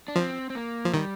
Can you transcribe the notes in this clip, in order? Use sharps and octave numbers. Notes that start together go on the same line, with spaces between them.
D4
F3 C4
C4
A#3
F3
D#3 G3